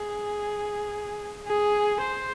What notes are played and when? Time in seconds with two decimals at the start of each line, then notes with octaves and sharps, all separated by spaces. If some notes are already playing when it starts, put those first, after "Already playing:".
Already playing: G#4
1.48 G#4
2.02 C5